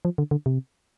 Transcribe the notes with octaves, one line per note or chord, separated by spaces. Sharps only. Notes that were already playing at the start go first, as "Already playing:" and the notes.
F3
D3
D3
C3